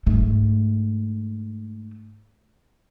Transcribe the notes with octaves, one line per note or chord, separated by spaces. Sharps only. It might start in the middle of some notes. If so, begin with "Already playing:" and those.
G#2 A3